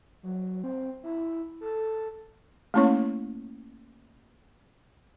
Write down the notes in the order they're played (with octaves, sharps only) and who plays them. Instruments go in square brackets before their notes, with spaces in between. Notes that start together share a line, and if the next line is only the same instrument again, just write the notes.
[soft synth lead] F#3
C4
E4
A4
[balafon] A3 A#3 C#4 E4 C#5 C#6